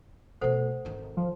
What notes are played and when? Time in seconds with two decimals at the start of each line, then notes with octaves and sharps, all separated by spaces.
0.41 B2 A3 A4 C5 F#5
0.85 G#1 D#3
1.17 F3